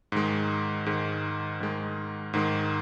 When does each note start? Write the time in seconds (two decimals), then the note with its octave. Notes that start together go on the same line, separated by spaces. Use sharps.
0.12 G#2 D#3 G#3
0.86 G#2 D#3 G#3
1.60 G#2 D#3 G#3
2.34 G#2 D#3 G#3